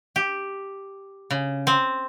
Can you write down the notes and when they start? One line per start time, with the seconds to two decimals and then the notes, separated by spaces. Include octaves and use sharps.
0.16 G4
1.31 C#3
1.67 C4